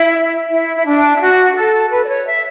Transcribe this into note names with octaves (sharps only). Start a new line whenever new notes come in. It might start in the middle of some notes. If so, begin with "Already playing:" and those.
Already playing: E4
E4
E4
D4
E4
F#4
A4
B4
D5
C#5
E5